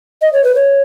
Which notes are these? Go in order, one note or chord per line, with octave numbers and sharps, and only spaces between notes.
D#5
C#5
B4
C#5